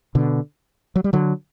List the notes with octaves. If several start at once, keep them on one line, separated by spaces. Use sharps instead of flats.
B2 D3
F#3
G3
D3 F#3